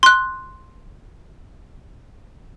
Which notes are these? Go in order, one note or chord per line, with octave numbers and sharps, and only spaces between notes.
C6 F#6